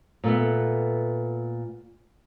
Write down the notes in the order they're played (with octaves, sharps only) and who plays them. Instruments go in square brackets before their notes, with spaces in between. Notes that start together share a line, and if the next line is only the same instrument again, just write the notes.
[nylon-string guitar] A#2 A3 B3